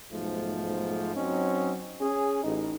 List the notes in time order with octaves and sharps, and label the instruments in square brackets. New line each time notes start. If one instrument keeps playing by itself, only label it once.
[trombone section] B1 G#2 F3 A3
F#3 C4 C#4 D#4
C#4 G#4
A1 D#4